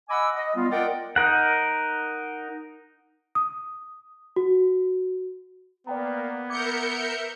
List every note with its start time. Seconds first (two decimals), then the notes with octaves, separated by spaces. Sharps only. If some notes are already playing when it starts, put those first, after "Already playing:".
0.09 D#5 F#5 G#5 B5 D6 E6
0.35 D#5
0.55 G3 B3 F4
0.70 F4 A#4 D5 D#5 F#5 G5
1.16 D#4 A#4 F#5
3.35 D#6
4.36 F#4
5.87 A#3 B3 D5 G5 A#5
6.49 A#4 E5 D6 G6 G#6 C#7